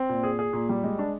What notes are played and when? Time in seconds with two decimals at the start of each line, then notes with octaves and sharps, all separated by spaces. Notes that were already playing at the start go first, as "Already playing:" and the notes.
Already playing: C4
0.09 A#2
0.23 G#4
0.39 G#4
0.53 A#2
0.69 G3
0.84 G#3
0.99 D4